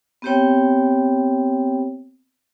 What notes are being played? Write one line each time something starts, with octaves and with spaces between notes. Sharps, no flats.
B3 C4 G4 C5 C#5 G5